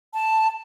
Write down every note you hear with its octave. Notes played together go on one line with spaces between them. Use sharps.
A5